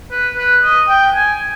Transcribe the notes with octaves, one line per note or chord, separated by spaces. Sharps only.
B4
B4
D#5
G5
G#5